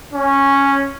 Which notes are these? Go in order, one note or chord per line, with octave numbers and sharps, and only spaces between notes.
C#4